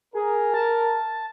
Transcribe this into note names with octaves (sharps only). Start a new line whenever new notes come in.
G#4 A#4
A5